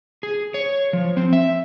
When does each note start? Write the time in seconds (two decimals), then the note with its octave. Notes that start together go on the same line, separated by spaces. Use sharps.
0.23 G#4
0.54 C#5
0.93 F3
1.17 C4
1.33 E5